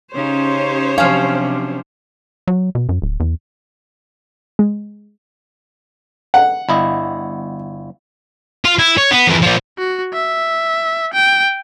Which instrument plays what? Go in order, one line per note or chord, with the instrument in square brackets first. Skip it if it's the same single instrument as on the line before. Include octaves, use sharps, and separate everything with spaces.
[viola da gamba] C#3 C#4 D#4 [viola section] G4 C5 C#5
[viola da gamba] C3 F#3 D4 [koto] F3 C#4 [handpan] F5
[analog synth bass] F#3
B2
F#2
D1
E2
[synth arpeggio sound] G#3
[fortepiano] F#5
[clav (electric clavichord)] G1 E4 D#5
[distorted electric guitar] F4
E4
C#5
B3
F2 E3
A#2 F3
[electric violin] F#4
E5
G5